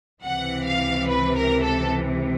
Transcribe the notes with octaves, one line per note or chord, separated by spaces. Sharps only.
C#2 C3 E3 F#5
F5
B4
A#4
A4